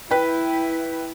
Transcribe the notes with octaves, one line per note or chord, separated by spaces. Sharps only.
E4 B4 G5